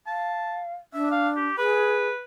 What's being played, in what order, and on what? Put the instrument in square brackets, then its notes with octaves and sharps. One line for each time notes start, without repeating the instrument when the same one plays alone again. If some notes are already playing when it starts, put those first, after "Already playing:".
[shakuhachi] F5 [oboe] A5
[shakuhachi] D4 [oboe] E5
[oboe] F5
G4
[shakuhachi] G#4 [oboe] B4